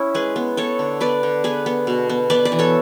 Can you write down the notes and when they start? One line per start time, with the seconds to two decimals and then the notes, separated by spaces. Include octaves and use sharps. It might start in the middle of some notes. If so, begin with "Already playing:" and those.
Already playing: C#4 E4
0.14 G#3 G#4 B4
0.36 B3
0.57 B3 A4 C#5
0.79 D3
1.00 B3 B4 D5
1.23 D3
1.44 B3 G#4 B4
1.66 B3
1.87 B2
2.09 B3
2.30 B3 B4 D5
2.45 B4 D5
2.52 E3
2.59 A4 C#5